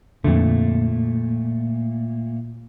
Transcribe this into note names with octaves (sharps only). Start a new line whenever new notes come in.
F2 A#2 D3 A3